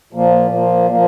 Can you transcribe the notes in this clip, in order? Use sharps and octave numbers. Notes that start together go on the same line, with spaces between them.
A#2 F3 A#3
A#2 F3 A#3
A#2 F3 A#3